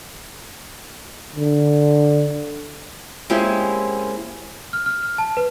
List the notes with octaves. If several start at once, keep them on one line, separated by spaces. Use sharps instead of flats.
D3
G#3 A#3 C4 C#4 E4 G4
F6
F6
F6
A5
B4